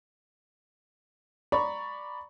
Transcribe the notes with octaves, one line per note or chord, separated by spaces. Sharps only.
D5 A#5 B5 C#6